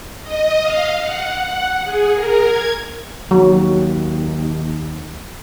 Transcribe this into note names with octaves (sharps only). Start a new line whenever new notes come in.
D#5
F5
F#5
F#5
G#4
A#4
G#6
D#2 F#3